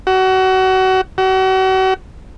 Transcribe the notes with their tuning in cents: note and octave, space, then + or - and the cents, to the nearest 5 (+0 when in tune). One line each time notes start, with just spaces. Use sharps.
F#4 +30
F#4 +40